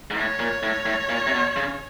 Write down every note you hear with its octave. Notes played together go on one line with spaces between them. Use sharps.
G#2
A2 C#5
A#2
A2
A2
A#2
C3
B2
C#3